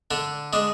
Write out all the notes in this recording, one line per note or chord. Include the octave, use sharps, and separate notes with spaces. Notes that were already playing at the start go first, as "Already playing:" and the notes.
D3 D4
G#3 D4